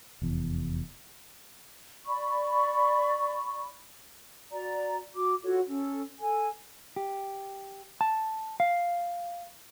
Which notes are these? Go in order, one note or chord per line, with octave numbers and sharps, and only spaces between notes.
F1 E2
D5 B5 C#6
F#4 D5 A#5
F#4 D6
F4 F#4 A4 C#5
C#4 A4
A4 G#5
G4
A5
F5